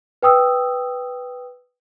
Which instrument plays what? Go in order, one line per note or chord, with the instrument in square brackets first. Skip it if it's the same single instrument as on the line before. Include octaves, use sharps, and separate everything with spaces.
[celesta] B4 G5 D#6 E6